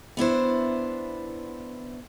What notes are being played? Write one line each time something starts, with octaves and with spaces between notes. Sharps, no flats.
B3 D4 E4 C5